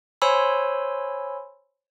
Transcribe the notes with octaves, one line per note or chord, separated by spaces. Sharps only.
C5 C#5 G#5 B5 C6 E6